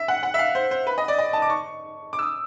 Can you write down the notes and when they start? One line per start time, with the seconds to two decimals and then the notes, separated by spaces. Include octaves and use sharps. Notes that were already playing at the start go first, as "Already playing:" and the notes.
Already playing: E5
0.08 F#5
0.23 F#5
0.34 E5
0.39 F5
0.55 C5
0.71 C5
0.87 B4
0.98 D#5
1.08 D5
1.18 D#5
1.33 A5
1.42 D6
1.50 C#6
2.13 D6
2.19 E6
2.23 D#6